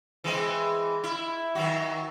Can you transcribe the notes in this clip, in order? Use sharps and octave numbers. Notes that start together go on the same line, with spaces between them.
E3 G#3 C4
E4
D#3 F#3 F#4